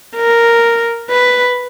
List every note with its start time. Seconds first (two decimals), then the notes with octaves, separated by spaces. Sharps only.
0.16 A#4
1.10 B4